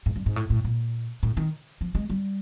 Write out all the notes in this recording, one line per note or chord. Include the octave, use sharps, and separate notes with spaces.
G#2
G2
G#2
A2
A2
A#2
A2
D#3
F3
G#3
G3